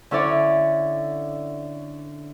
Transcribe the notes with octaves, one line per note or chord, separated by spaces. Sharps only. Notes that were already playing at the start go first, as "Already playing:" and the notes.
D3 C#4 E4 A4 C#5 D5